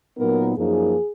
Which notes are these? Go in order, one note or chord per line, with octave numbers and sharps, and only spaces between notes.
A#2 F#3 B3 D#4 A#4
F#2 F3 A#3 D#4 G#4